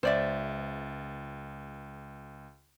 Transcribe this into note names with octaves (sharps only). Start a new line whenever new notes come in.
C#2 C5 D5 E5 A6